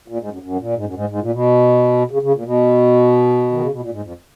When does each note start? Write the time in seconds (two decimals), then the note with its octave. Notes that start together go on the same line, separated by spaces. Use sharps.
0.08 A#2
0.19 G#2
0.31 F#2
0.42 F#2
0.59 A#2
0.76 G#2
0.85 F#2
0.94 G#2
1.09 G#2
1.21 A#2
1.32 B2
2.11 C#3
2.22 C#3
2.34 A#2
2.45 B2
3.52 D#3
3.61 C#3
3.71 B2
3.80 A#2
3.91 G#2
4.03 F2